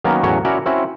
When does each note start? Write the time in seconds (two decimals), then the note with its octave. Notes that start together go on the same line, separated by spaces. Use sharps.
0.04 D#3 F#3 A#3 B3 C#4 A#4
0.23 E2 A2 F#3 C#4 F#4 C#5
0.45 C#4 E4 F#4 A#4 C#5 D5
0.66 C4 C#4 E4 F#4